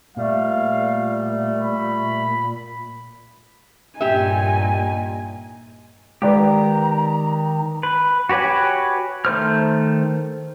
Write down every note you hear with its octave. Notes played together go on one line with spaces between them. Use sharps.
A#2 G3 A3 F5
B5
G2 A#2 D#4 G4 E5 G#5
D#3 G#3 G4 B4 D5 G5 A#5
B4
F#4 G4 B4 C#5 G#5
D#3 A3 C5 F6